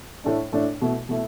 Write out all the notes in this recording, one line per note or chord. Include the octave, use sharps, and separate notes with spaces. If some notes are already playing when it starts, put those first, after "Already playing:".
A2 A3 D4
A2 A3 D4
B2 A3 E4
B2 A3 E4